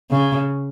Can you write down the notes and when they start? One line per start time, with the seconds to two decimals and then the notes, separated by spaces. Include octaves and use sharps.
0.10 C#3